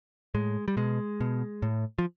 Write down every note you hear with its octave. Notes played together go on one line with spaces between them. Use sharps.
A2 G#3
G3
B2 G#3
B2
A2
F3